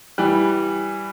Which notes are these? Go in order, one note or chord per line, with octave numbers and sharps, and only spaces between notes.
E3 G3